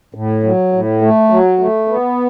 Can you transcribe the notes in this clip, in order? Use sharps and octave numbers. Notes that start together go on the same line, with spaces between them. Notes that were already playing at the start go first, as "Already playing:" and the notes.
A2
F#3
A2
A3
F#3
A3
B3